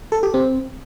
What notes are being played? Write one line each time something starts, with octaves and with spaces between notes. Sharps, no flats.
A4
G4
C4